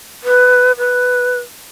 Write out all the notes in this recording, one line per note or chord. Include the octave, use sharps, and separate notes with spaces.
B4
B4